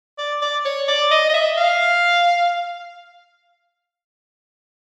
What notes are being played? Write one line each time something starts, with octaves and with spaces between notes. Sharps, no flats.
D5
D5
C#5
D5
D#5
D#5
E5
F5